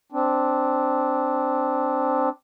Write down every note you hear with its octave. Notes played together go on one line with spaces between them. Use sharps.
C4 D4